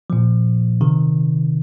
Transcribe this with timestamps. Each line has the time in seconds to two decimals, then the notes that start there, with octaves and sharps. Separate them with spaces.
0.10 A#2 F3
0.81 C3 D#3